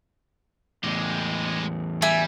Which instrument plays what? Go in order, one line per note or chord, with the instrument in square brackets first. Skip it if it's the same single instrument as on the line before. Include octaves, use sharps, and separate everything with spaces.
[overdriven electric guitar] E2 A2 [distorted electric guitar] G#3 G4
[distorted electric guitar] G3 [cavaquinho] E5 G#5